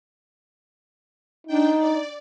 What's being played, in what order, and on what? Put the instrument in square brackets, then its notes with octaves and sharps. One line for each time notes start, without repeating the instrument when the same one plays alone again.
[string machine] D4 G5 [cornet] D#4
[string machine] D5